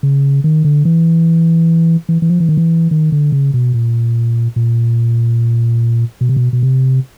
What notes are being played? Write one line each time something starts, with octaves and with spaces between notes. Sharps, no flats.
C#3
D#3
D3
E3
E3
E3
F3
E3
D#3
E3
D#3
D3
C#3
B2
A#2
A#2
B2
C3
B2
B2
C3